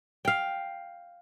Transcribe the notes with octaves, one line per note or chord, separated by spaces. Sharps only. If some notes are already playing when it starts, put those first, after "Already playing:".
F5 G5